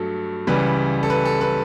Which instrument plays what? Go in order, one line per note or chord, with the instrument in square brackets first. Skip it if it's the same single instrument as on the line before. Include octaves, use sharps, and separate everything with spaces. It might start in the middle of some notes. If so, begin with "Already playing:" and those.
Already playing: [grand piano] G2 F#3 A3 A4
C#2 C#3 E3 G3 B4
A4
B4
A4
B4